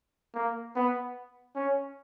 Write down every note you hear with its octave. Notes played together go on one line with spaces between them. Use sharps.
A#3
B3
C#4